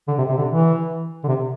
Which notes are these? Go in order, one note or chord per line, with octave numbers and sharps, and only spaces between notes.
D3
C3
C3
D3
E3
D3
C3